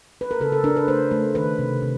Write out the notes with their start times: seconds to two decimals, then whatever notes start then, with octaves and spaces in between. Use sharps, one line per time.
0.21 B4
0.31 A#4
0.41 C#3 A4
0.52 A4
0.64 D4 A#4
0.77 B4
0.88 A3 C5
1.11 A3
1.35 D#3 B4
1.59 C3
1.82 C3